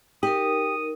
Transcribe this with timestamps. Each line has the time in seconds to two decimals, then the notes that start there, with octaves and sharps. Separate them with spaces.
0.23 D#4 G4 A#4 D#6